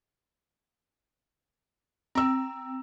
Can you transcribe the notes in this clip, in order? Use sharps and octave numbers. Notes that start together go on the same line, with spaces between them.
C4 A#5 E6